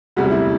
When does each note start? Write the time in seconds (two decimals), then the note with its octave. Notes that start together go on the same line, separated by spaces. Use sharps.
0.17 E1 D2 C3 G3 F#4
0.31 E4